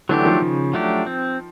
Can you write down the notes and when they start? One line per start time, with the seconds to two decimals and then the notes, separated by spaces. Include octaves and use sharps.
0.09 D3 E3 F#3 A3 D4 G4
0.25 D#3 F3
0.42 C#3
0.74 F#3 A3 D4 G4
1.06 C4